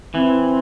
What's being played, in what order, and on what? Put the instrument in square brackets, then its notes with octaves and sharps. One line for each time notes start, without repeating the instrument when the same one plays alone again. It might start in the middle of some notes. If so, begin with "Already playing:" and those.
[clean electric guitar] E3 [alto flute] C4